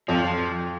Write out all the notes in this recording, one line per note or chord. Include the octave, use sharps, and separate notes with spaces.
F2 F3
F3